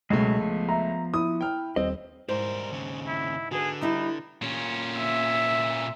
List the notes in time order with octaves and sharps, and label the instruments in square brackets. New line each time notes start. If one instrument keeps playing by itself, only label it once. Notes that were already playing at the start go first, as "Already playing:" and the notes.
[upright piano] C#2 A3 [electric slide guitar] B2 F#3 G#3
[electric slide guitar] F3 B3
[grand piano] E5 A#5
[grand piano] E4 [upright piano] D#6
[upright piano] G5 F6
[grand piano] D#1 [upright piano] C4 [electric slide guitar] D#5
[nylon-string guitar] G#2 [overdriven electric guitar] G3 A#4 [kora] C5
[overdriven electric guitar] D#2 C#3
[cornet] E4
[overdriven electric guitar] D3 [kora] B3 F#4 [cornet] G#4
[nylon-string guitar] G3 E4 G4 [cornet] D#4
[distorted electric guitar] A#2 C#4
[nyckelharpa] E5